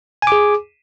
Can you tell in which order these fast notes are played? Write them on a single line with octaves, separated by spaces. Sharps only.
G#5 D6 G#4